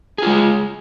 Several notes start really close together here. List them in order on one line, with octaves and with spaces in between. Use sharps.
G#4 F4 G#3